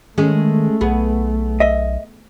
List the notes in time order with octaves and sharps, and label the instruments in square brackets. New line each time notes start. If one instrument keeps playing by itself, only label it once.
[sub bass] D#3 [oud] G#3 C#4 G#4 [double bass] A3
[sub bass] B1 [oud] B3 G#4
[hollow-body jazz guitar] D#5 E5